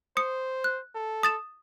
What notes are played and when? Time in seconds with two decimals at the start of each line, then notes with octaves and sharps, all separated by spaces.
0.17 C5 D#6 C#7
0.64 F#6
0.95 A4
1.23 D#6 A6 E7